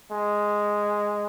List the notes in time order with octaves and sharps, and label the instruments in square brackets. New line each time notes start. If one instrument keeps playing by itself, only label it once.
[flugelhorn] G#3